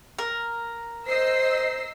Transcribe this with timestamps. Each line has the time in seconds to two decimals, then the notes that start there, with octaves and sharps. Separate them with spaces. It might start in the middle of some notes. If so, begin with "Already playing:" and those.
0.19 A#4
1.07 C5 D#5 E6 C7